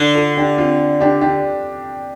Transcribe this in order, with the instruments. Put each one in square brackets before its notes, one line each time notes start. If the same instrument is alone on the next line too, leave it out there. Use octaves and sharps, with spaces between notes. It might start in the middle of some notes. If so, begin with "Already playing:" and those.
Already playing: [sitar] D3
[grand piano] F4 A4
D4 G4
C4 F4
D4 G4
D4 G4